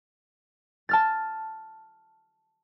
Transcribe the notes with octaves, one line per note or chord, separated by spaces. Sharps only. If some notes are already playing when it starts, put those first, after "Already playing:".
A5 F6 A6